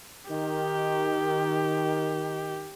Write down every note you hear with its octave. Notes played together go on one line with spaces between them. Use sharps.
D#3 G4